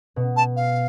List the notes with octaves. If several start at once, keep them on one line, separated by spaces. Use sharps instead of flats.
B2
A5
F5